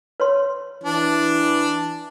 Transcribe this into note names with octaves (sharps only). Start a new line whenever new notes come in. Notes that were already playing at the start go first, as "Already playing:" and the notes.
B4 C#5 C6
E3 D4